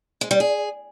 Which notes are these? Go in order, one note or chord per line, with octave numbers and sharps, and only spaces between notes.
G#3
G3
G#4